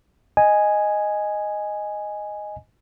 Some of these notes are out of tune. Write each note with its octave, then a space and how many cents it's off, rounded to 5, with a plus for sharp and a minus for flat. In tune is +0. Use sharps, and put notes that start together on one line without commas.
D#5 -5 G#5 +0